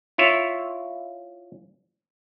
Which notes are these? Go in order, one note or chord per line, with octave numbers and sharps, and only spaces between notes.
E4 F4 C#5 E5